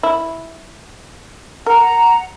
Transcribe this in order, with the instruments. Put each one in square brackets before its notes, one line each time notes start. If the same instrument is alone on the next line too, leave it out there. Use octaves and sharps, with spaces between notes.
[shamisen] E4
[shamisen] A#4 [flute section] F#5 A#5